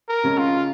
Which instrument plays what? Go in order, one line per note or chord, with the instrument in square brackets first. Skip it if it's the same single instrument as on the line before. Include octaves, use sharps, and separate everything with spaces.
[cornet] A#4
[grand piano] C#3 G#3 C#4
[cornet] F4